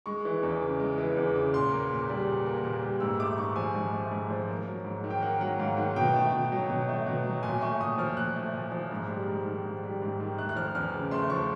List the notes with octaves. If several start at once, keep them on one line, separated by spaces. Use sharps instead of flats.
G#3 C#6
E3
E2
C#3
G#3
E3
E2
C#3
A#2 C6
A#3
A#2
G3
A#2
A#3
A#2
G3
G#2 E6
A3 D6
G#2 C#6
F3 G#5
G#2
A3
G#2
F3
A#3
F#3
G#2
D#3
G5
A#3 F#5
F#3 F#5
G#2 F5
D#3 F#5
B2 G5
A3
B2
F#3
B2
A3
B2
F#3
A#2 G#5
A3 C#6
A#2 D#6
F3 F6
A#2 F#6
A3
A#2
F3
G#2
G3
G#2
D#3
G#2
G3
G#2
D#3
A3 F#6
F#6
F3 F6
E2 F6
C#3
A3 C6
F3 C#6